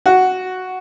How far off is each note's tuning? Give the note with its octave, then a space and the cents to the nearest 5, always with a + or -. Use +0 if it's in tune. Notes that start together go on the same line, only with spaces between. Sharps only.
F#4 +0 F#5 +5